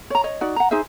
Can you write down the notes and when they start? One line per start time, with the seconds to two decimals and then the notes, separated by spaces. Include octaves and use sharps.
0.10 C#5 A#5
0.24 C#5 D#5
0.41 D#4 F#4 D5
0.56 F#5 A#5
0.71 D#4 G#4 C5 E5